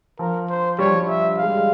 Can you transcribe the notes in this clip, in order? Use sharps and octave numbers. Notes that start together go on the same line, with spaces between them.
F3 A#4
C5
G3 C#5
F3
G3
E5
G#3 F5
G3
G#3